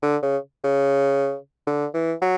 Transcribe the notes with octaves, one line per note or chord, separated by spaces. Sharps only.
D3
C#3
C#3
D3
E3
F#3